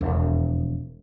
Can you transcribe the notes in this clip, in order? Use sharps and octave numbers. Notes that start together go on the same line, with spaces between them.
E1 F2